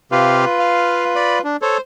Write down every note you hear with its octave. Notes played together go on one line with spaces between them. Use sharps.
C3 F4 G4 B4 F5
F5
D5 B5
D4
A4 C5 C#5